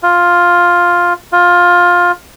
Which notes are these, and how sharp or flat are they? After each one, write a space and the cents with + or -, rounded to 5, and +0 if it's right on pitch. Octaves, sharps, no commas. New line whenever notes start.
F4 +5
F4 +15